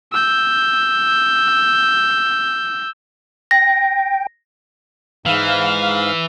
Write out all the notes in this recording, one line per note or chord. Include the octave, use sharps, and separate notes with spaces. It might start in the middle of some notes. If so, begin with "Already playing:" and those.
E6 G6
G5 A#6
G#2 E3 F5 F6